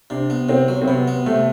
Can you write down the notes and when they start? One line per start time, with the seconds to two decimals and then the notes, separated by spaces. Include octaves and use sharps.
0.10 C3 D4
0.30 B3
0.49 C3 C4
0.68 F#3
0.82 C4
0.87 C3 B3
1.08 B3
1.26 C3 A3